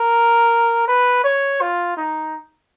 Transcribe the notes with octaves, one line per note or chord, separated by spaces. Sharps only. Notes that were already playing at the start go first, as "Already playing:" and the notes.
Already playing: A#4
B4
C#5
F4
D#4